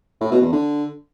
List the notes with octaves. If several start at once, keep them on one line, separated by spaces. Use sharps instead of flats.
A2
B2
E2
D3